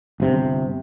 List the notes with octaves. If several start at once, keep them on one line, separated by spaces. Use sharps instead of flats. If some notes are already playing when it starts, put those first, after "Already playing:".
G1 C3